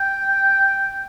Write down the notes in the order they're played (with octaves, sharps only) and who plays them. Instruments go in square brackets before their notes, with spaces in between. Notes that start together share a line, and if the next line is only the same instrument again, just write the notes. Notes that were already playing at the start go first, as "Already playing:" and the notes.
Already playing: [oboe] G5